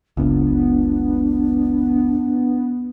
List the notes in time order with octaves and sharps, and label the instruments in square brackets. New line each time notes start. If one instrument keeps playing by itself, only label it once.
[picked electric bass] F#1 C#2 [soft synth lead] B3 [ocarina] D4